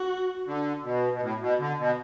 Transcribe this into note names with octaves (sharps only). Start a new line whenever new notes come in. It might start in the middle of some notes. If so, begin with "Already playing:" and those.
Already playing: F#4
D3
B2
B2
A2
B2
D3
B2